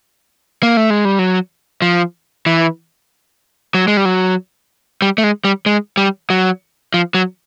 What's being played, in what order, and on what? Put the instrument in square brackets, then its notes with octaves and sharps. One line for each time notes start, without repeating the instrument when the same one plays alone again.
[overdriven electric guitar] A#3
A3
G#3
G3
F#3
F3
E3
F#3
G#3
G3
F#3
G3
A3
G#3
G3
G#3
G3
F#3
F3
F#3